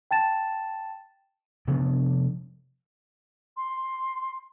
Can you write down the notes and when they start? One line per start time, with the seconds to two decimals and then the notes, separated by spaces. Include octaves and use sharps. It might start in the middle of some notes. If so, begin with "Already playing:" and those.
0.11 G5 A5 A6 E7
1.68 C3 F3 B3 D4
3.57 C6